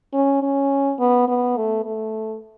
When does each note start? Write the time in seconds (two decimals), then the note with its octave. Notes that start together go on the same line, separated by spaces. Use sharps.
0.13 C#4
0.42 C#4
0.99 B3
1.28 B3
1.57 A3
1.85 A3